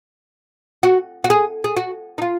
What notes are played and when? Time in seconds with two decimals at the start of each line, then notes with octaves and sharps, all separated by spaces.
0.83 F#4
1.24 F#4
1.30 G#4
1.64 G#4
1.77 F#4
2.18 D#4
2.22 F4